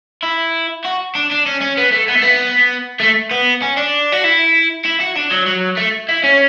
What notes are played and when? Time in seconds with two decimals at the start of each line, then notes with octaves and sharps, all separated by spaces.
0.23 E4
0.85 F#4
1.15 D4
1.31 D4
1.46 C#4
1.61 C#4
1.78 B3
1.92 A3
2.08 B3
2.15 A3
2.22 B3
3.00 A3
3.31 B3
3.62 C#4
3.77 D4
4.12 F#4
4.24 E4
4.85 E4
5.00 F#4
5.16 D4
5.31 F#3
5.46 F#3
5.77 A3
6.09 E4
6.23 C#4